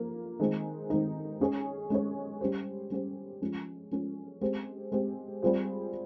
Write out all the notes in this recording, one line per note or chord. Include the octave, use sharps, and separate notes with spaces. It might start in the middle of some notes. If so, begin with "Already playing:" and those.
Already playing: F3 A#3 F4
D#3 G#3 C4 D#4
D#3 G#3 C4 D#4
G#3 C#4 G#4 C#5
G#3 C#4 G#4 C#5
G3 C#4 G4 C5
G3 C#4 G4 C5
F3 G#3 C#4
F3 G#3 C#4
G#3 C4 G4
G#3 C4 G4
G3 C4 F4 G#4 C5